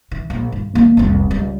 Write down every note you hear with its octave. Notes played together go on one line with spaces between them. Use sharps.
E3
A#1
G2
A#3 D4
F1 C2
C#2 G3